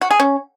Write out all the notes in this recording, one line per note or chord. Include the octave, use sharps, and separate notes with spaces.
F#4
G#4
C#4